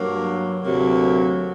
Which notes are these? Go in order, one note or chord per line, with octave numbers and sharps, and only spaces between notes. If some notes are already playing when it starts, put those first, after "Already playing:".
Already playing: G2 F#3 A#3
D2 C3 F#3 A#3 F#4